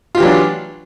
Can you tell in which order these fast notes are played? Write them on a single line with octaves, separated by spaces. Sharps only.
F4 G4 E3 F#3 D4